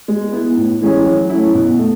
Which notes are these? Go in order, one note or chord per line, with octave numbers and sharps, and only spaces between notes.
G#3
B3 E4
A2
E3 G#3 C#4 G#4
F#3
A3 C#4 E4
B2
A3